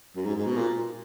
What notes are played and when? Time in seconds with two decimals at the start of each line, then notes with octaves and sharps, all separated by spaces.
0.16 F#2
0.25 G#2
0.36 G#2
0.46 B2
0.56 A#2